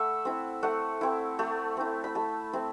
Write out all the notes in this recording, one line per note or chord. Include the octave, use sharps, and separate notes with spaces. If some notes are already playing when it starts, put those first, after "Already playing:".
Already playing: A3 E5 F#5 B5
C4 E4
A3 F#5
C4 E4
A3
C4 E4
B5
A3 A5
C4 E4